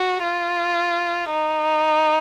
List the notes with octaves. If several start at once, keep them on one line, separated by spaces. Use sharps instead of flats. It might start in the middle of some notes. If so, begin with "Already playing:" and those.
Already playing: F#4
F4
D#4